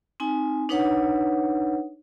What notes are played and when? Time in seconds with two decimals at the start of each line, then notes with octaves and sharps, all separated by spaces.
0.20 C4 D#4 G#5
0.69 D4 D#4 B4 C#5 F#5